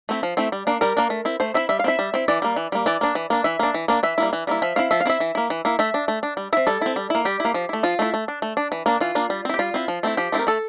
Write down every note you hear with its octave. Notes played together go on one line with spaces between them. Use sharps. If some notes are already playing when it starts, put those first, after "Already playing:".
A3 C4 E4
F3
A3 C4 E4
G3
A#3 D4
G3 A#4
A#3 D4
A3
C4 E4
A3 C5
C4 E4 E5
G3 E5
F5
C4 E4 E5
G3
C4 E4
E3 D5
G3 A#3
E3
G3 A#3
E3 D5
A#3 D4
E3
A#3 D4
E3 E5
A#3 D4
E3
A#3 D4
E3 E5
G3 A#3 E4
E3
G3 A#3 E4
F3 E5
C4 E4 F5
F3 E5
F5
C4 E4 E5
E3
A#3 E4
E3
A#3 E4
A3 E5
D4
A3
D4
G3
C4 E4 E5
G3 A4
C4 E4
G3
A#3 E4
G3 G4
A#3 E4
F3
A3 E4
F3 F4
A3 E4
A3
D4
A3
D4
E3
A#3 D4
E3 F4
A#3 D4
G3
C4 E4
G4
G3 F4
C4 E4
F3
A3 C4 E4
F3 G4
A3 C4 E4
A#4
A3 A4